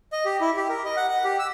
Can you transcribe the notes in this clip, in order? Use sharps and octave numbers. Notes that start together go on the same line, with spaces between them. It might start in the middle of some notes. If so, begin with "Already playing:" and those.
D#5
G4
E4
G4
A#4
D#5
F#5
F#5
G4
E6